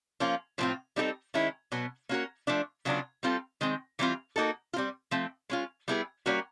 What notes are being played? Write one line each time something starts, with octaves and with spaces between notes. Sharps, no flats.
F3 A#3 C#4 F4
A2 F3 A3 C4 F4
G3 C4 D#4 F#4 A4
D#3 G#3 C#4 E4
B2 F#3 B3
A#3 C#4 F#4 A#4
F3 A3 D4
C#3 F#3 B3 D4 F4
G3 C4 F4 A4
D#3 G#3 C4
E3 G3 C4 F4
A#3 D#4 F#4 A4
F4
G3 C4
F3 A3 C4
G#3 C#4 F4
G3 B3 E4 G#4 B4
G3 A#3 C#4 F#4 A#4